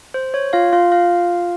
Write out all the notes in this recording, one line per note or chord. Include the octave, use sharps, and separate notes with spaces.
C5
C#5
F4 F5
F4 F5
F4 F5